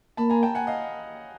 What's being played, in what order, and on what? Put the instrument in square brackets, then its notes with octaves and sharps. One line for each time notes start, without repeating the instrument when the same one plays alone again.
[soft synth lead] A#3 [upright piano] A5 B5
[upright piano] G#5 A#5
G5 A5
F#5 G#5
D#5 F5